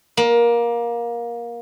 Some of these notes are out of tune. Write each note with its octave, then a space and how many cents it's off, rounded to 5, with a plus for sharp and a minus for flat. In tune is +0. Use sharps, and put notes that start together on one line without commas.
A#3 +20